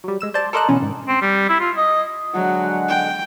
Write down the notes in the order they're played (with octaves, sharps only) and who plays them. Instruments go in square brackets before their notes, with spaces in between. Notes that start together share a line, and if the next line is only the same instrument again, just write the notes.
[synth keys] F#3 G3
G#3 E6 E7
C5 D5 A5
A4 A#4 C5 D5 D#5 F#6
B2 D3 E3 C#4
G#2 D#3
[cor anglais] C4
G3
E4
F4
D#5
[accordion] D3 G#3 F#5 [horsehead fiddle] F#3
[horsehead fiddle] G5